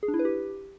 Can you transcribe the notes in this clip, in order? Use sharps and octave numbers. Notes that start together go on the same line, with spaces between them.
G#4
D4
E4
B4
G4